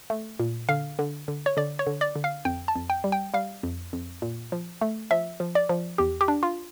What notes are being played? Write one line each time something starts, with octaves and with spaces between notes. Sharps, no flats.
A3
A#2
D3 F5
D3
D3
C#5
D3 D5
C#5
D3
D5
D3
F5
F2 G5
A5
F2
G5
G3
G5
G3 F5
F2
F2
A#2
F3
A3
F3 E5
F3
D5
F3
E2 G4
G4
D4
F4